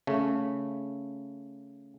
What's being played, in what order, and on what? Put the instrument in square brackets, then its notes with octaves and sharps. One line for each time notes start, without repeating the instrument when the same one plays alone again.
[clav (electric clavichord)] C#3 A3